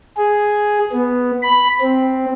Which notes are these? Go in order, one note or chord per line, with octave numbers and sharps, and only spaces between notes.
G#4
B3
B5
C4